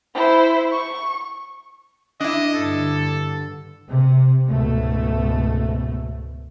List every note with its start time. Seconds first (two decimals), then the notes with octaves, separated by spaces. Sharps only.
0.14 E4 C5
0.72 C#6
2.20 D4 E4 D#5
2.56 G2 D3 A4
3.88 C3
4.46 C#2 G#2 B2 A3